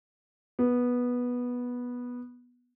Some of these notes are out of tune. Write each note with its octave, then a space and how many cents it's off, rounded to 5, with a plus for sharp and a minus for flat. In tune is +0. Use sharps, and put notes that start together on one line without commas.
B3 -10